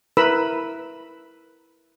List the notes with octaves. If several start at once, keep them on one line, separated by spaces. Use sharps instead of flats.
E4 A#4 B4 B5 E6